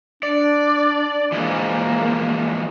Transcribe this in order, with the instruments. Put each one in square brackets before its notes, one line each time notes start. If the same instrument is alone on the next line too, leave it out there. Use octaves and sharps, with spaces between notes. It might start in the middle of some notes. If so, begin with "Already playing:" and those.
[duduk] D4 [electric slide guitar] D5
[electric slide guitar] E3 F3 G#3 [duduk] A#3